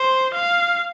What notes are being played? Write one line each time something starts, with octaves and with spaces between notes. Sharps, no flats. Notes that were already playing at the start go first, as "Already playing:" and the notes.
Already playing: C5
F5